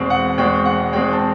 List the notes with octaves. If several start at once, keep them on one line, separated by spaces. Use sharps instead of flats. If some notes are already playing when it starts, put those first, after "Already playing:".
Already playing: E2 B2 G#3 C4
F#5
E2 B2 G#3 C4 G5
F#5
E2 B2 G#3 C4 G5
A5